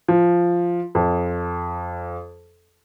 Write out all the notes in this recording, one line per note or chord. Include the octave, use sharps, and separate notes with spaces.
F3
F2